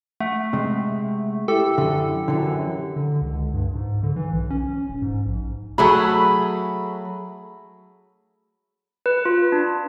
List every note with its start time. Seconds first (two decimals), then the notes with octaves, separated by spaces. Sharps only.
0.20 A3 F#5
0.53 C3 G#3
1.48 E4 G4 A4
1.78 F#2 D3
2.28 F#2 D3 E3
2.96 D3
3.22 C#2
3.54 G2
3.76 G#2
4.03 D3
4.16 E3
4.33 B1
4.50 C#4
4.90 D#1
5.02 G#2
5.26 A#1
5.78 F#3 A3 G#4 B5
9.06 B4
9.25 F4
9.52 D4